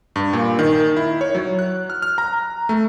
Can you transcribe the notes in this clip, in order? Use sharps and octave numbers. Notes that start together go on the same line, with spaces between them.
G2
A#2
D#3
E4
C#5
F#3
F#6
F6
F6
A#5
A3